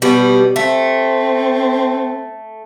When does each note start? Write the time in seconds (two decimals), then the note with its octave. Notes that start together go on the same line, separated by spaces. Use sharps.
0.02 B2 G3
0.56 A3 C4